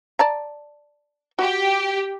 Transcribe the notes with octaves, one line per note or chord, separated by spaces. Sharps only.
D5 A5 A#5
F#4 G4